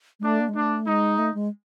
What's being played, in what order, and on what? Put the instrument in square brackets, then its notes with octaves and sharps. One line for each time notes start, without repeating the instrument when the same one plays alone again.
[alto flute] G#3
[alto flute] A3 [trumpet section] D4
[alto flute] A#3
G#3
[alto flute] A3 [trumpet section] D4
[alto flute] G#3 [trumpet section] D#4
[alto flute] A3
G#3